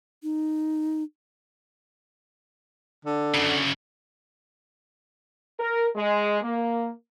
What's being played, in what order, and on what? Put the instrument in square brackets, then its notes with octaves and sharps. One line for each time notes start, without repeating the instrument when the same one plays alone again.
[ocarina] D#4
[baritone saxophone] D3
[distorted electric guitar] F#2 C#3
[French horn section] A#4
G#3
A#3